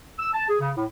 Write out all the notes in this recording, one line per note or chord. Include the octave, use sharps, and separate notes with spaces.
E6
A5
G#4
C#3
A2